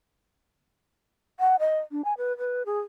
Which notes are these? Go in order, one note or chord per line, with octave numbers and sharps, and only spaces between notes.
F#5
D#5
D4
G#5
B4
B4
G#4